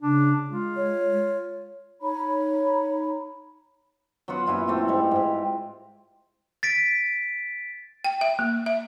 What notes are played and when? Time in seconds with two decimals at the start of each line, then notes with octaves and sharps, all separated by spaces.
0.02 C#3 D4
0.50 G#3 F4
0.76 C#5
2.02 D#4 C#5 A#5 B5
4.28 F#3 B3 F4 F#5
4.47 F#2 A#2 E4 F4
4.67 A3 C4 A4
4.88 G#2 G3
5.11 G#2 G4
6.63 A6 B6 D7
8.04 G5
8.21 E5
8.39 A#3
8.66 E5